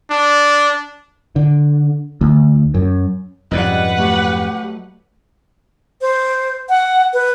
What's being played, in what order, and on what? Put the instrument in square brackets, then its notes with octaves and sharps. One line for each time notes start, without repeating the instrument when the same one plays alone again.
[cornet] D4
[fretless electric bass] D3
D2
F#2
[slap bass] F2 G#2 C#3 [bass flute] G3 [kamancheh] B4 F#5 [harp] D5 D#5
[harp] F#3 A3 [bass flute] G4
[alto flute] C5
F#5
B4